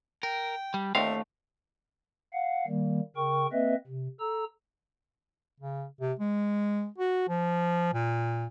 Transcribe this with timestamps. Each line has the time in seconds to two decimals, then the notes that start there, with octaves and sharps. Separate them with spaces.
0.23 A#4 G5
0.74 G3
0.95 D#2 E3 A3 C4 D4 E5 F5
2.33 F5 F#5
2.67 D#3 G3 A#3
3.16 C#3 A#4 G5 C#6
3.52 A#3 C4 B4 D#5 E5
3.87 C3
4.20 A4 A#5 E6
5.60 C#3
6.00 C3
6.19 G#3
6.98 F#4
7.28 F3
7.94 A#2